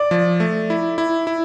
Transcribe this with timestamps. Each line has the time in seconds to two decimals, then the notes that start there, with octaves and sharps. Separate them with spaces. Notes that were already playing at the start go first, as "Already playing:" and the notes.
Already playing: D5
0.11 F3
0.40 A3
0.70 E4
0.98 E4
1.27 E4